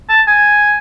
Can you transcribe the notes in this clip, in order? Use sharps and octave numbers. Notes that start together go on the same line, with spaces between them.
A5
G#5